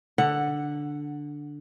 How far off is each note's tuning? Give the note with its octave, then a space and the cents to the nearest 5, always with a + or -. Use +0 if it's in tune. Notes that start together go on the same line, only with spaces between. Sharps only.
D3 +0 F#5 +0